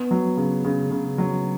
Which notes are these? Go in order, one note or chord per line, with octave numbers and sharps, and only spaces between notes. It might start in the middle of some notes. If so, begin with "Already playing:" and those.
Already playing: B3
F#3
C#3
C#3
C#3
F#3